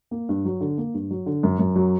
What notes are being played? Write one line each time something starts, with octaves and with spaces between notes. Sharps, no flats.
A#3
G2
F#3
D3
A#3
G2
F#3
D3
F#2
F#2
F#3